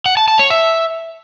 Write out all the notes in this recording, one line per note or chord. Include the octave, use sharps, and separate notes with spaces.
F#5
A5
A5
C#5
E5